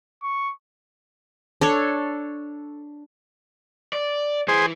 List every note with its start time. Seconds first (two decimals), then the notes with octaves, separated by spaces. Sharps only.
0.22 C#6
1.61 D4 A4 C#5
3.93 D5
4.48 E3 G#4 C5